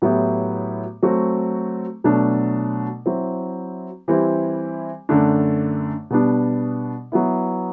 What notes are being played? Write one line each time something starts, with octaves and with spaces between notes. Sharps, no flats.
A2 F#3 B3 E4 G4
F#3 A3 C4 F#4
B2 F#3 A3 D4
F#3 C4 E4
E3 G3 C4 E4 G4
F#2 D3 A3 D4
B2 G3 B3 D4
F#3 B3 E4